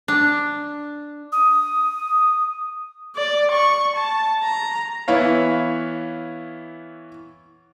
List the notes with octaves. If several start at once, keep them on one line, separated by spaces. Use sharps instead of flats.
D4
D#6
D5
C#6
A5
A#5
E3 B3 E4 C#5 F5